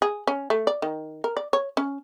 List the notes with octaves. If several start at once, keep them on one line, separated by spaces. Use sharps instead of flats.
G#4
C#4
A3
D5
D#3
A#4
D5
C#5
C#4